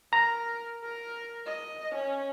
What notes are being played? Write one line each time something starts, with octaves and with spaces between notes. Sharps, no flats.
A#4 A#5
A#4
D#5
C#4